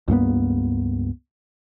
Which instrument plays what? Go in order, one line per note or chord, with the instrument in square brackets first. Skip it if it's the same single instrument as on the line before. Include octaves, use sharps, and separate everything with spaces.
[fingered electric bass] C#2 G2 A#3 B3